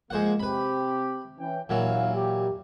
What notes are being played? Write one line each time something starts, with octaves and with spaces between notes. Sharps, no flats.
F3 G#3 A#3 C5 F#5
C3 C4 G4 B4 B5
E3 C#4 G5
D#2 A#2 E3 F#3 F5
G4